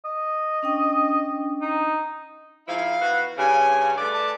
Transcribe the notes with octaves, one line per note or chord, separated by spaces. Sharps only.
D#5
C#4 D4 G5
D#4
G#2 F3 E4 F5
E3 B3 F#4
G2 C#3 G#5
A3 B4 D5 D6
A5